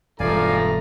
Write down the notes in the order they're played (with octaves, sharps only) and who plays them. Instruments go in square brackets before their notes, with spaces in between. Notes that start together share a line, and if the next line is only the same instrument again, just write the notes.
[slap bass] E1 [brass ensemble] G2 A#5 [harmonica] F3 A3 [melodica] D5 F5 G#5